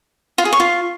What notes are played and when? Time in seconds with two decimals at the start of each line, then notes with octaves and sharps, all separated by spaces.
0.38 F4
0.45 G#4
0.53 C#5
0.60 F4